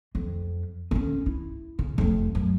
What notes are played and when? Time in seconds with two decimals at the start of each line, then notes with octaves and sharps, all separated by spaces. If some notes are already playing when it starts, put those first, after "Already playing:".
0.15 F2
0.91 D3 C#4
1.26 E4
1.79 C#3
1.98 F1 F2
2.35 F#2